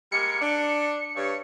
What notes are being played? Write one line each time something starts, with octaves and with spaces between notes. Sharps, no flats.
G3 G#3 A#3 C#7
D4
G2 C#5